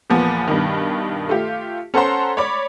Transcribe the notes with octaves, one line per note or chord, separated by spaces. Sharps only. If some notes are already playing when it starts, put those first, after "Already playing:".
E2 A#2 F3 B3
G2 B2 D#3
A3 F4 G4
C#4 A4 C5 F#5 A#5 C6
C#5 D5 B5 D6